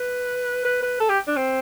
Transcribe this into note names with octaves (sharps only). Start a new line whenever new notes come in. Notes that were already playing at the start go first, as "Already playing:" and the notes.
Already playing: B4
B4
B4
A4
G4
D4
C4